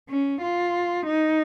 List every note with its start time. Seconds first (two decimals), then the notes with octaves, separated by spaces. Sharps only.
0.09 C#4
0.42 F4
1.06 D#4